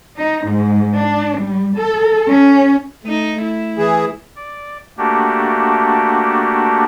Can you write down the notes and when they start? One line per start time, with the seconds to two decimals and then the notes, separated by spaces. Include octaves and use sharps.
0.18 D#4
0.48 G#2
0.96 D4
1.40 G3
1.78 A4
2.30 C#4
3.03 A3 D#4
3.42 E4
3.78 E3 G#4
4.36 D5
4.98 A3 A#3 D4 F#4 G4